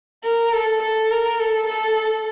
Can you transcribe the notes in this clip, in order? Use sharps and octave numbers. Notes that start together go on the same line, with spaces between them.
A#4
A4
A4
A#4
A4
A4